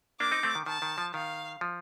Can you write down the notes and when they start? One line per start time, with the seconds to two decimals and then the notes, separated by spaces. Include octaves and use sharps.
0.20 A#3 D4 D6
0.31 C4 D#4
0.43 A3 C4
0.55 D#3
0.66 D#3 A5
0.82 D#3
0.98 F3
1.14 D#3 F5
1.61 F3